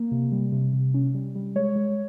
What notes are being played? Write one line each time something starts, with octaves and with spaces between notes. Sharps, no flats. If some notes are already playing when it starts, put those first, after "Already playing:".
Already playing: A#3
C3
G3
C3
C3
C#4
G3
G3
G#3 C#5
G#3